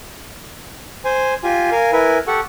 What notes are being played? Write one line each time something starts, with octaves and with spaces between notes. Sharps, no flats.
C5 G#5
F4 G4 G#5
A#4 F5 G#5
E4 A#4 B4 G#5
G4 A4 F#5 C#6